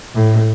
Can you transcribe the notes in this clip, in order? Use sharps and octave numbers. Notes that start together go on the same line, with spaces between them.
A2